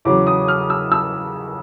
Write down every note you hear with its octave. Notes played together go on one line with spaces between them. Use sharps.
E2 C#3 F#3 D6
D#6
F6
E6
E6